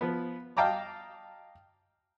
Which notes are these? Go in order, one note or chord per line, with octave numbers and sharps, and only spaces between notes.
F3 B3
D#5 F5 G5 A5 A#5 D6